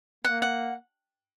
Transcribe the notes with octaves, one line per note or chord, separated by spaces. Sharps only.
A#3 F#5
F#5